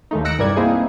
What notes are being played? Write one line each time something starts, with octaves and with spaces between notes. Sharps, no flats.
D#2 G#3 A3 D#4
E6 F#6 A#6 C#7 D7
C2 G2 A#4 B4 D5 G#6
A#3 C4 D#4 E4 G#4